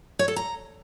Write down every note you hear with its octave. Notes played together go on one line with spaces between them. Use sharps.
C#5
A4
A#5